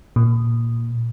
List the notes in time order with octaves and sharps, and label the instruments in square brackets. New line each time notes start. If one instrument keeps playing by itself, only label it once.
[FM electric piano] A#2